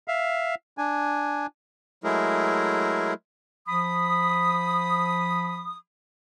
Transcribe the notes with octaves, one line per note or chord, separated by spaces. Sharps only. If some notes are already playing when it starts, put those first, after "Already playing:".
E5 F5
D4 G#5
F#3 G#3 A3 E4 G#4 A#4
F3 B5 D#6